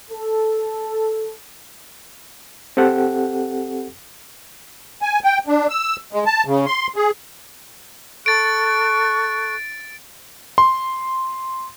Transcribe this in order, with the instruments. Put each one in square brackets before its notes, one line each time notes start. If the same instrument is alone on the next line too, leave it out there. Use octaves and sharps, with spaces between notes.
[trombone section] A4
[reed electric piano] C4 G4 A4 F#5
[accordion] G#5
G5
D4
E6
G#3
A5
C#3
C6
G#4
[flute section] A4 C#6 F#6 [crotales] A6 D7
[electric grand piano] C6